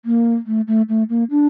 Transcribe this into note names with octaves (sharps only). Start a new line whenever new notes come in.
A#3
A3
A3
A3
A#3
D4